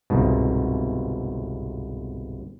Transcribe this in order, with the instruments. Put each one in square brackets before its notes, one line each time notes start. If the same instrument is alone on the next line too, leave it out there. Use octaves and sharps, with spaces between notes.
[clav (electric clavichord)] G1 C2 G#2 B2